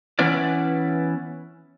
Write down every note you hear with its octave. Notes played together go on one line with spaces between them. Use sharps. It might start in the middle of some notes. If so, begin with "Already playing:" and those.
E3 B3 C#4 E4 B4 D5